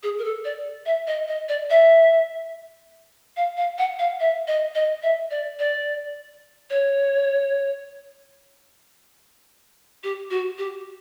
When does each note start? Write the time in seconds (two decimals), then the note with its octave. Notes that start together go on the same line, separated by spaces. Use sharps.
0.03 G#4
0.19 A#4
0.24 A4
0.45 D5
0.86 E5
1.07 D#5
1.28 D#5
1.49 D5
1.70 E5
3.37 F5
3.57 F5
3.78 F#5
3.99 F5
4.20 E5
4.48 D#5
4.75 D#5
5.03 E5
5.31 D5
5.59 D5
6.70 C#5
10.04 G4
10.30 F#4
10.58 G4